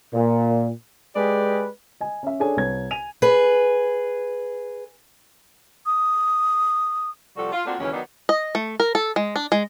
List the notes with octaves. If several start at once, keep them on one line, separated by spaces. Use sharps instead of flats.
A#2
G#3 G4 G#4 B4 D5
D#5 G#5
C#4 E5
D4 G#4 A4 C#5 G#5
C2 B4 C#5 G#6
G#5 D#7 F7
G#4 B4
D#6
C3 F3 G3 F#4 A4 F#5
F4
A3 A#3 C4 D4 F4 F#4
D#2 C#3 E3 F#3 C#4
D#3 F#3 B3 D4 D#4
D#5
A3
A#4
A4
G#3
D4
G#3